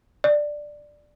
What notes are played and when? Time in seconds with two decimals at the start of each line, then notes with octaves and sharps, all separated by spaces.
0.24 D5